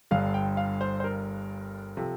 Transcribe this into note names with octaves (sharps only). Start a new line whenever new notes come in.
G1 G2 D3 F5
G5
F5
C5
C5
A#4
C3 F3 A4